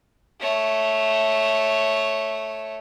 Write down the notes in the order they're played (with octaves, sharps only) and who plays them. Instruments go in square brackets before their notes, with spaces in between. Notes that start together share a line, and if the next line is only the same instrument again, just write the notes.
[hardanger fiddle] A3 C#5